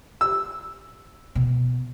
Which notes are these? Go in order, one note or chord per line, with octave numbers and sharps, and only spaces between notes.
E6
B2